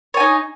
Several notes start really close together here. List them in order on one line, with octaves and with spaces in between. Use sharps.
C#5 G#5 D#4